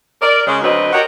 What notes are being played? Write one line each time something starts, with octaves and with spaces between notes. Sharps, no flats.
A#4 D5
C#3 G#3
D2 F#3 C4 B4 D#5
F#4 G4 A#4 C#5 D#5